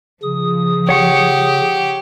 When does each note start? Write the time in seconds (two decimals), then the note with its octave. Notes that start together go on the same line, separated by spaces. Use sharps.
0.23 C#3 F3 D#6
0.89 G4 C#5 F#5 C#6